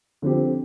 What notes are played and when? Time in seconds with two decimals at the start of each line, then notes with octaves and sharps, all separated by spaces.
0.22 D3 F3 C4 G4